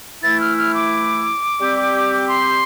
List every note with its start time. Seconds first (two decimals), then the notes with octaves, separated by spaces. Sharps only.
0.23 E3 A3 E4 A6
0.40 F6
0.58 F6
0.75 D6
1.60 G3 C4 G4
2.28 C6